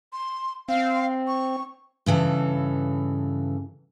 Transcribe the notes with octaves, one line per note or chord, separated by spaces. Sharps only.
C6
C4 F5
C#6
G2 C#3 E3 A4